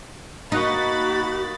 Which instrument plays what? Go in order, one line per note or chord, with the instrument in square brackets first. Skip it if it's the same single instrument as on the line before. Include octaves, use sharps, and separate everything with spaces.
[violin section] A#3 B5 A6 [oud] D#4 [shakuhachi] F#4 [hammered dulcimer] D#5 F#5 C#6